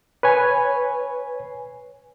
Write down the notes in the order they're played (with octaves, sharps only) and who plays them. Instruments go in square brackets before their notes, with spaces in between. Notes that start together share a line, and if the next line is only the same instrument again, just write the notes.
[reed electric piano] B4 C#5 G#5